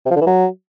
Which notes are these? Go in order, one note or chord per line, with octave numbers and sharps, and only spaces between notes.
C3
F3
D3
E3
F#3